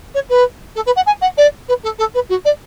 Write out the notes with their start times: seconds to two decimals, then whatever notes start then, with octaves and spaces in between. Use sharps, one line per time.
0.14 C#5
0.29 B4
0.75 A4
0.86 B4
0.96 F#5
1.06 G#5
1.21 F#5
1.37 D5
1.68 B4
1.83 A4
1.98 A4
2.14 B4
2.29 F#4
2.45 D5